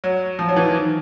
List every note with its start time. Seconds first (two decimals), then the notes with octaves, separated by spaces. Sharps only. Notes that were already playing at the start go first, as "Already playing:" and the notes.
0.04 F#3
0.39 F3
0.49 F#3
0.56 E3
0.65 D#3